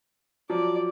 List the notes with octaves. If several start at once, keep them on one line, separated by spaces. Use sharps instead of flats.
F3 F#3 D5